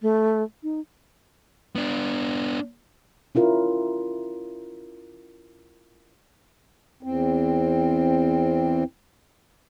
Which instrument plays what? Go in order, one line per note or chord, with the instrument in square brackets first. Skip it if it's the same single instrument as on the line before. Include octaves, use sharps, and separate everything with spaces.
[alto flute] A3
D#4
[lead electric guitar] B3 D4
[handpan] C#4 E4 F4 A#4
[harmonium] E2 C4